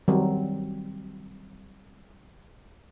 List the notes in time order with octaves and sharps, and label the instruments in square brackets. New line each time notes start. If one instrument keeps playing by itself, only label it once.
[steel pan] D#3 F#3 G3 C4